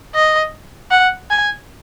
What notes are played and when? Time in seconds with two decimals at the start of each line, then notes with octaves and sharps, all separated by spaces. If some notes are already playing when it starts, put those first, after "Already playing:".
0.15 D#5
0.91 F#5
1.30 G#5